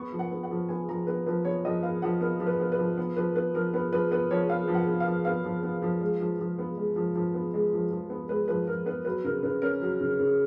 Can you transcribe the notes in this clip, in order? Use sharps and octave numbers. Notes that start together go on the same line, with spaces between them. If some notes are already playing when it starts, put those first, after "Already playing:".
Already playing: B3 C#6
F3
F#5
B3
F#5
F3
B3 G#5
F3 A#5
B3 B4
F3 B4
B3 C#5
F3 D#5
B3 F5
F3 F#5
B3 A#4
F3
B4
B3
B4
F3
B3
F3 B4
B3 B4
F3 A#4
B3 B4
F3 B4
B3 B4
F3 C#5
B3 F5
F3
F#5
B3
F5
F3
B3 F5
F3
B3
F3
G#3
F3
F3
B3
G#3
F3
F3
B3
G#3
F3
F3
B3
G#3 B4
F3 B4
F3 A#4
B3 B4
F#3 B4
C#3 A#4
C#3 B4
C#4 A#4
F#3
C#3
C#3